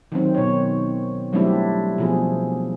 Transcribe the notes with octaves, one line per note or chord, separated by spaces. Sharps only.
D#3 F#3 C4
B2 C#5
F#3 G3 A3 C4 D4 E4
B2 F3 G#4